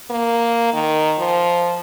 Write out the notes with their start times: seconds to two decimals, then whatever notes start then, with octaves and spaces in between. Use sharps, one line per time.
0.10 A#3
0.73 D#3
1.19 F3